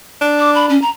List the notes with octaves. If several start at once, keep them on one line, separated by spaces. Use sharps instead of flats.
D4
D6
B5
C#4
A#5